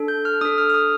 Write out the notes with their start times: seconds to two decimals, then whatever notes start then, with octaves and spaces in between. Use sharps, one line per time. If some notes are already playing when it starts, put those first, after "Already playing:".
Already playing: D4 A4
0.08 G6
0.25 F6
0.41 D4 A4 D#6
0.58 F6
0.70 F6
0.74 D#6